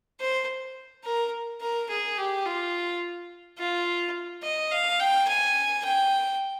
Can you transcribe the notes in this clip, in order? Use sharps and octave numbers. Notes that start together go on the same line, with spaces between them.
C5
A#4
A#4
G#4
G4
F4
F4
D#5
F5
G5
G#5
G5